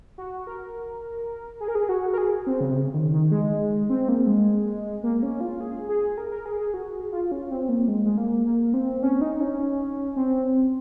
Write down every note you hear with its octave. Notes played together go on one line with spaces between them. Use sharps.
F#4
A#4
G#4
A#4
G#4
F#4
A#4
G#4
C4
C#3
C3
C#3
D#3
D#3
G#3
C4
A#3
G#3
A#3
C#4
F4
G#4
G#4
A#4
A#4
G#4
G#4
F#4
F4
C#4
C4
A#3
G#3
G#3
A#3
A#3
C4
C#4
D#4
C#4
C4